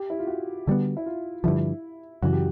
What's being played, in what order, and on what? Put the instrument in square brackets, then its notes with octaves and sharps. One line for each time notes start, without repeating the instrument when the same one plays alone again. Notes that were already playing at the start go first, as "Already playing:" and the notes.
Already playing: [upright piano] G4
E4
F4
F#4
[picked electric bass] D3 G3 B3
[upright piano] E4
F4
[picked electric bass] G2 D3 F3 [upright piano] E4
[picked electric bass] F#2 C#3 E3 [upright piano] F#4
[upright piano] G4